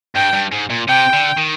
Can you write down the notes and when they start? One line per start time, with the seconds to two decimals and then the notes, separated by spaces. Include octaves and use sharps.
0.16 G2 G5
0.33 G2
0.52 G#2
0.70 A#2
0.88 C3 G5
1.13 D3
1.37 D#3